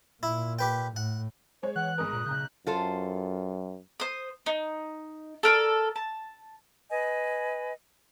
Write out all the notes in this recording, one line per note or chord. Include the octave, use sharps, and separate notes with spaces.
A#2 E4
G4 B4 G5
A2 F#5
G#3 C5 C#5
E3 F#5 F#6
G1 G#3 A#4 D#6
A#2
B1 C#3 A#5 G6
F#2 F4 A4 C5
C5 D#6
D#4
A4 A#4 C5 D5
A5
B4 D#5 G#5